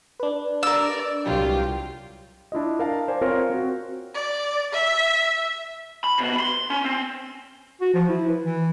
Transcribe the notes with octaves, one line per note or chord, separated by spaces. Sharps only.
D4 B4
A#4 D5 E6
C2 F#3 F4 G4
D4 E4 F4 D#5
A#4 F5 A5
C5 D5 G#5
C4 F4 A#4 C5 C#5 F5
C4 F#4
D5
E5
B5
C3 B3
B5 C6
C#4
C4
F#4
F3
E4
B4
E3